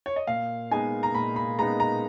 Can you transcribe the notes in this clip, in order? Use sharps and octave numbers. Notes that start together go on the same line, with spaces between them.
C#5
D#5
A#2 F5
G#3 B3 D#4 G#5
A#5
A#2 B5
B5
G#3 B3 D#4 A#5
A#5